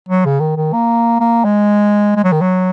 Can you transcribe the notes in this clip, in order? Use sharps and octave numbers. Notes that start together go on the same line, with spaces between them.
F#3
C#3
D#3
D#3
A#3
A#3
G#3
G#3
F#3
D#3
F#3